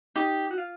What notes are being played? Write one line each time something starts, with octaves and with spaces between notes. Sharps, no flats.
D#4 G4
F#4
F4